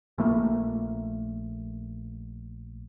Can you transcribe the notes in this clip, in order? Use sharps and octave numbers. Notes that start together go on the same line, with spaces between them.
A#1 A3 A#3